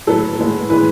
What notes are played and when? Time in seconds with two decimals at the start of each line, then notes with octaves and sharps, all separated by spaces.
0.07 A2 F#3 B3 A4
0.38 A2 G#3 B3
0.69 A2 E3 G#3 B4